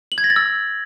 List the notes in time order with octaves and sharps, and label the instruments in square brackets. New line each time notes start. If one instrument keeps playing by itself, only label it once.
[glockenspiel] F#7
G#6
A#6
A6
E6